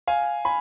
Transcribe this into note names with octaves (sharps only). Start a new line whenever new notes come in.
F5 G#5
G#5 B5